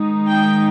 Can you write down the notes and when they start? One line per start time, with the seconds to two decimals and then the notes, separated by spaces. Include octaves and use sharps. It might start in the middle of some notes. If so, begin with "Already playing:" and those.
Already playing: D#3 G#3 D#4
0.28 G5